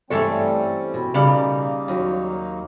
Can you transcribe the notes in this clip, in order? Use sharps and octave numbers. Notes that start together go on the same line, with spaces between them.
G2 E3 G3 A3 C4 C#4 A4 C#5
B2
C#3 G3 A#3 D#4
D#2 F#3